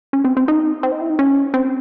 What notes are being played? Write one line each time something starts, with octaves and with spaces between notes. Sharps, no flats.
C#4
C4
C4
D#4
C4
D#4
E4
D#4
C#4
C4